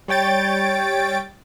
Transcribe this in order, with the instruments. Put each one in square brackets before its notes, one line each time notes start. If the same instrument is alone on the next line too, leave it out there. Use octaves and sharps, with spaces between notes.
[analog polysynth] G3 C#5 G5 A6 D7